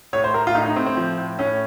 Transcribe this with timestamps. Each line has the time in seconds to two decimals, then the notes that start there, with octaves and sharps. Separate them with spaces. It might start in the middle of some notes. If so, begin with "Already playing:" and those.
0.13 A2 C#5
0.24 C5
0.34 A2 A#4
0.47 F4
0.55 A2 D#4
0.66 D#4
0.76 A2 C4
0.87 C4
0.97 F3
1.18 A2
1.39 A2 C#4